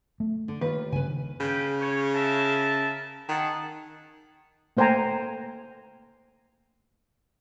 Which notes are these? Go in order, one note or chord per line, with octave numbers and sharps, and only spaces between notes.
A3
D3
D#2 F4 B4
G2 C#3 B4 G#5
C#3 B4 G5
C#5
A#4 E5 A5
D#3 G#4 F#5 A5
A3 A#3 C5 G5 G#5 A#5